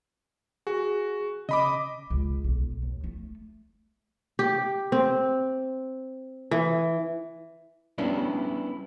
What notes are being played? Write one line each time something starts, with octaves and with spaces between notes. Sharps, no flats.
F#4 G#4
C#3 D#5 B5 D6
C#2
B1
D#2
A3
G4
C4
E3
G3 B3 C#4 D4 E4